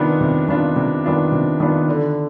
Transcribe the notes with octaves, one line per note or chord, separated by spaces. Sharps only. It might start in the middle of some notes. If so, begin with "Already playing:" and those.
Already playing: C3 D#3 B3 D4 F4
C3
D#3 B3 D4 F4
C3
D#3 B3 D4 F4
C3
D#3 B3 D4 F4
D3